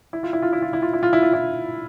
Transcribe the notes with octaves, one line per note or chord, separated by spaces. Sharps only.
E4
F4
E4
F4
E4
F4
E4
F4
E4
F4
E4
F4
E4